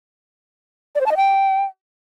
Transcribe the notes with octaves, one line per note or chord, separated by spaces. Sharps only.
D5
C5
A5
D#5
G5